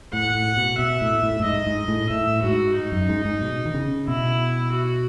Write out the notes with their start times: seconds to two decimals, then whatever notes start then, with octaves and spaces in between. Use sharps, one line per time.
0.13 A2 F#5
0.35 A2
0.57 B2
0.79 B2 E5
1.01 A2
1.23 A2
1.40 A2
1.45 G#2 D#5
1.67 G#2
1.88 A2
2.10 A2 E5
2.43 G#2 F#4
2.76 D#4
2.92 F#2
3.09 G#2
3.25 G#2
3.41 B2
3.65 D#3
3.74 C#3
4.08 B2 E4
4.72 F#4